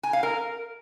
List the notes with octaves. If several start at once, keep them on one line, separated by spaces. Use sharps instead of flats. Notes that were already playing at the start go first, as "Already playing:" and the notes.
G#5
F5
A#4